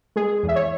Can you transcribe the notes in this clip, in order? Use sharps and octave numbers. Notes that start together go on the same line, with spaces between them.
G#3 G#4
E2
E5
C#5